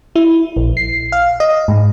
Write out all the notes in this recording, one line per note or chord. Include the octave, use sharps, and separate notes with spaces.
E4
A#1
C7
F5
D#5
G#2